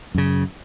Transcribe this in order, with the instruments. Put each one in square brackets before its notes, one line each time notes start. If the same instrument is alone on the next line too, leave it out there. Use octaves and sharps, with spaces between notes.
[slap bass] F#2 C#3